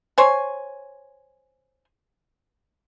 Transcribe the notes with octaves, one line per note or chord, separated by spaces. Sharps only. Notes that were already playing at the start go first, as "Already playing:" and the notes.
C5 C#5 G#5